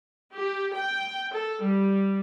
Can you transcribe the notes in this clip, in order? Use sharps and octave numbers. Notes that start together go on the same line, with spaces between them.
G4
G5
A4
G3